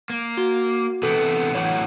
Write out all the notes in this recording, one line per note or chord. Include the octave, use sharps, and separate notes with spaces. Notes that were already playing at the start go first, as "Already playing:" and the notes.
A#3
F#4
C3 E3 B3 A4
A2 E3 F#3 C#5 F#5